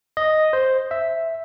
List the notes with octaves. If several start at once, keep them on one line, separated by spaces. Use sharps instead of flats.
D#5
C5
E5